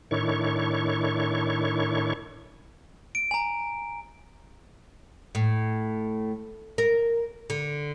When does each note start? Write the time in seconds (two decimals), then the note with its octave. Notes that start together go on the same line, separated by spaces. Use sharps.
0.11 A2 D#3 D4 E4 C#5 C#6
3.15 D7
3.31 G#5 A#5
5.35 A2
6.78 A#4
7.50 D3